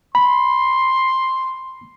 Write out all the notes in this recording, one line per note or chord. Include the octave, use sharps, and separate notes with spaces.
B5 C6